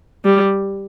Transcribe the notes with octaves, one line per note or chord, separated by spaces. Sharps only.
G3